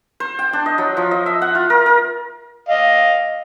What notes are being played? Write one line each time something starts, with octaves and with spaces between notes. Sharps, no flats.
C5
G5
D4
D#5
F#3
F3
D#5
E5
F#5
F4
A#4
A#4
D#5 F5